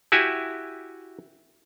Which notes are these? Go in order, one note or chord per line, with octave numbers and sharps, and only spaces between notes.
E4 F#4 G4 E5 G#5